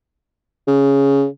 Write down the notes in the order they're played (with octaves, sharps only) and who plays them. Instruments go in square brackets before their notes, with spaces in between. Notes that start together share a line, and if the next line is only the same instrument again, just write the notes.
[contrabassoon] C#3